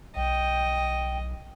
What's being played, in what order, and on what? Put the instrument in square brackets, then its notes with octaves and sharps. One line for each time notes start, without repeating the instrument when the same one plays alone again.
[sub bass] B1 [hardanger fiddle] D#5 [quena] G5